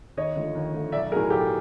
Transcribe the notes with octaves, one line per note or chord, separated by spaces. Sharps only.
D#2 C#5 D#5
D3 F3 A3
D#2
D3 F3 A3
B1 D5 E5
A2 F#3 G#4 A#4
B1 G4 A4